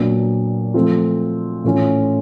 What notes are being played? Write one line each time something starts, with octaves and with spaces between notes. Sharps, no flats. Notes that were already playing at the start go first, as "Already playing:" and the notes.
Already playing: A#2 F#3 B3 D4
F3 A3 C4 F4
A2 E3 A3 C#4 F4